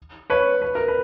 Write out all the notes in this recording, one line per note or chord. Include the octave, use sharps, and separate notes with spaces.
B4 C#5
B4
A#4
B4